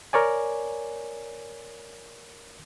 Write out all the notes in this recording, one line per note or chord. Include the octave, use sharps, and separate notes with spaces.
A#4 C#5 D5 G#5